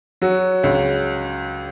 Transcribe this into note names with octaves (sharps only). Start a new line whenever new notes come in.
F#3 F#4
C#2